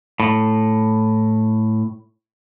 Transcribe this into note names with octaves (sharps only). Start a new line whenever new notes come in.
A2